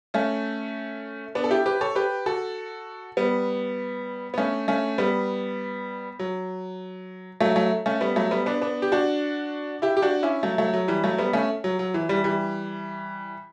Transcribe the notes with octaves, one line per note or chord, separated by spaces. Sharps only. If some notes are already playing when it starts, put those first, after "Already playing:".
A3 C#4
B3 D4
A4
E4 G4
G4 B4
A4 C#5
G4 B4
F#4 A4
G3 B3
B3
A3 C#4
A3 C#4
G3 B3
F#3
F#3 A3
F#3 A3
A3 C#4
G3 B3
F#3 A3
G3 B3
B3 D4
B3 D4
G4
D4 F#4
E4 G4
G4
D4 F#4
C#4 E4
F#3 A3
F#3 A3
F#3
E3 G3
F#3 A3
G3 B3
A3 C#4
F#3
F#3
E3
E3 G3
E3 G3